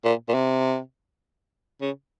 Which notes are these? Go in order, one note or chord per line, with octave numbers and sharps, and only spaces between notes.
A#2
A#2
C3
C#3